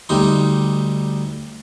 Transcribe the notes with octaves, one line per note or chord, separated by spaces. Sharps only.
D2 G3 D#4 C6